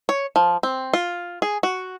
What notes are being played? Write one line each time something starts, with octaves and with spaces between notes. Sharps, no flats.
C#5
F3
C4
F4
G#4
F#4